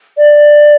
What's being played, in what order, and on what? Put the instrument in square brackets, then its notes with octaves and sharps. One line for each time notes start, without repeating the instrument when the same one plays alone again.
[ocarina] D5